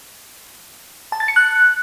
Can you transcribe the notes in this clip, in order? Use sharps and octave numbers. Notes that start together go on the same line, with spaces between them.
A5
A6
C#7
F#6